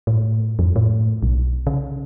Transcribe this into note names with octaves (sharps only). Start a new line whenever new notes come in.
A2
F2
A2
B1
C#3